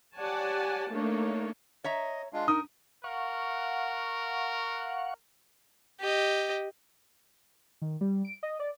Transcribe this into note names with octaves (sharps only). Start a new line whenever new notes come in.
G4 C#5 D5 F#5 G#5 A5
A3 A#3 D4 D#4 C#5
C#5 D#5 E5 A#5
G#3 D4 F4
D#4 A#4 D#6
A#4 F5 F#5 C#6
G4 D#5
D#3
G3
D7
D#5
D5